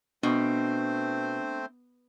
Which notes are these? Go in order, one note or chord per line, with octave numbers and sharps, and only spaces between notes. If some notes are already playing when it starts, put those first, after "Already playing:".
B2 A3 C4 D4 C5